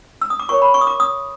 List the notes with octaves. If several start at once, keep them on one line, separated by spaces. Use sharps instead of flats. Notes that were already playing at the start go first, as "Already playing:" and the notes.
E6
D#6
D6
F4 A#4 C#5 C#6
B5
C#6
D#6
D6
D#6